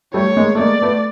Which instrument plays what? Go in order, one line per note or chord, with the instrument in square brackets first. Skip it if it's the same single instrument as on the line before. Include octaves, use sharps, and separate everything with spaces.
[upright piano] G3 A3 [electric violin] C#5
[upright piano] G#3 A#3
A3
[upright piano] G#3 A#3 [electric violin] D5
[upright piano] A3 B3